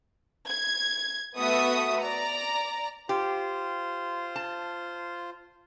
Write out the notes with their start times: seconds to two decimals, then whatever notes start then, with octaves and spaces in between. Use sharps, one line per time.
0.48 G#6
1.38 A3 B3 F#4 E5 D#6
2.01 D5 A#5
3.09 F4 G4 C5
4.36 A5